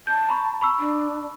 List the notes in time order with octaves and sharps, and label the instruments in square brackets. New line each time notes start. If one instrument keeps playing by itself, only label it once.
[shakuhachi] A5 [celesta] G6
[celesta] A#5 B5 C#6
B5 C#6 E6
[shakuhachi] D4